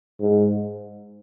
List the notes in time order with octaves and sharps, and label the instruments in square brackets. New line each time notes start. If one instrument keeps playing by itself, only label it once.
[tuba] G#2